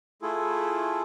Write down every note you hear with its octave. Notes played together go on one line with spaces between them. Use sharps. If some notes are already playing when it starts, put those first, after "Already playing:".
A3 E4 F4 G#4 A4